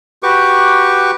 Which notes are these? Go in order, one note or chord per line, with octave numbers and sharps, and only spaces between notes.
F#4 G4 B4 C#6 D6